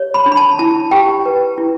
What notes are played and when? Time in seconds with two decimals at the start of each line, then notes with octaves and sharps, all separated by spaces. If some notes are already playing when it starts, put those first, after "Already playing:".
Already playing: G4 C#5
0.14 B5
0.26 D4
0.32 B5
0.37 A5
0.59 E4 A5
0.91 G4 G5
1.25 B4
1.58 E4